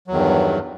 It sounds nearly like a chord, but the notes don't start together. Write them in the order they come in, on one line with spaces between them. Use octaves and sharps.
F#3 E2 D#3 G2